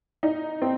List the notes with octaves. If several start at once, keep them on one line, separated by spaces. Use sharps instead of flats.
D#4
C4